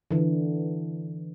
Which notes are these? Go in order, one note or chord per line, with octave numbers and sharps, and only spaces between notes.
D3 E3